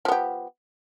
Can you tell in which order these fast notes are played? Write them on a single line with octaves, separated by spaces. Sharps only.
F3 B3 G4